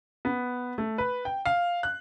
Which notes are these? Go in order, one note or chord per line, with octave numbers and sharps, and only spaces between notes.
B3
A3
B4
G5
F5
F#6